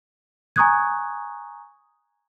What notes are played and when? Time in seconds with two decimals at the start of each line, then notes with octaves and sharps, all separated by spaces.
0.56 G#5 A#5 C#6 D#6 F#6 G#6